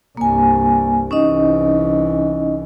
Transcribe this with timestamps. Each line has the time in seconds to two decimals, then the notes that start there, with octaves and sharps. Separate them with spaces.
0.17 C2 G2 A#3 G#5
1.11 C2 E3 C#4 D#4 D#5